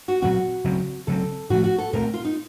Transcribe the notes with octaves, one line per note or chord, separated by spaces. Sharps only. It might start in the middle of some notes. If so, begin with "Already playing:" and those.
F#4
A#2 F#3 C4 F#4
C#3 F#3 C4
C#3 F#3 C4 A4
A2 F3 A3 F#4
F#4
A4
A#2 A3 C4 A#4
F4
D#4